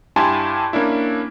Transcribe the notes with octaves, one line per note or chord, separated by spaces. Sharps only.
G2 E4 G4 G#5 A5 C6
A#3 C#4 D4 E4